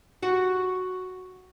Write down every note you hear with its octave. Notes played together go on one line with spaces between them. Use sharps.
F#4